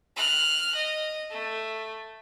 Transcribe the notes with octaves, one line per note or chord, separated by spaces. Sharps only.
F6 F#6
D#5
A3